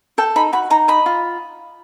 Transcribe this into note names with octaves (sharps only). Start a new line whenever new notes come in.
A4 G5
D#4 B5
F#4 B5
D#4 A#5
D#5 B5
F4